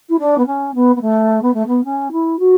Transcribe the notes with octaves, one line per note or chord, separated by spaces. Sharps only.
E4
D4
B3
C#4
B3
B3
A3
B3
A3
B3
C#4
E4
F#4